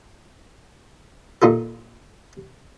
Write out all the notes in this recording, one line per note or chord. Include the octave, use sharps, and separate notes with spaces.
A#2 D#4 F4 A4